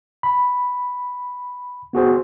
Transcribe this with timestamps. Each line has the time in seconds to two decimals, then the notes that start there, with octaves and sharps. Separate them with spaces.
0.23 B5
1.93 B3 F#4 G#4 C5